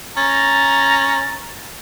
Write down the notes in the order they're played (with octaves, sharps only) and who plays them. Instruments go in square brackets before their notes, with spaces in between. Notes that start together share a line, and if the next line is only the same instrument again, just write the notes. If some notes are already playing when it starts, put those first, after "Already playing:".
[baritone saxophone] C#4 [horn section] A#5 [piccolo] A6